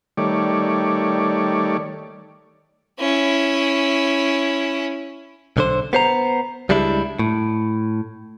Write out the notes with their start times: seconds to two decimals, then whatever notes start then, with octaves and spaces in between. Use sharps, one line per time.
0.17 D#3 G3 A3 C#5 D5
2.99 C#4 E4
5.57 B1 D3 C5
5.93 B3 C5 A#5
6.69 C#2 G3 G#3 D4 E4
7.19 A2